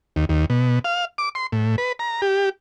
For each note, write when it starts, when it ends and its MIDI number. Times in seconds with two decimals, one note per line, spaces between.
0.16 0.25 39
0.29 0.45 39
0.50 0.79 47
0.84 1.05 77
1.18 1.29 86
1.35 1.47 84
1.52 1.76 45
1.78 1.92 71
1.99 2.21 82
2.22 2.49 67